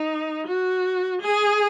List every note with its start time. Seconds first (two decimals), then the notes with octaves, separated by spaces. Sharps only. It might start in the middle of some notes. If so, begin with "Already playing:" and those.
Already playing: D#4
0.47 F#4
1.21 G#4